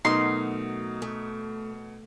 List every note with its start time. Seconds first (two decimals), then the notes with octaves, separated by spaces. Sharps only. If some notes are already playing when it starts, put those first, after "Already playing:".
0.05 B2 F#3 A3 D#4 A#4 C6
1.02 A3